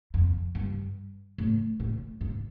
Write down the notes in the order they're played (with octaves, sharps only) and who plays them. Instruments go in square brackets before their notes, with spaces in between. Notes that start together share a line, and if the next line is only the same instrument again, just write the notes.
[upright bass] F2
G2
A2
A2
G#2